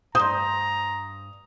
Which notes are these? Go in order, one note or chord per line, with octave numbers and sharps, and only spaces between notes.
G2 C5 A#5 D#6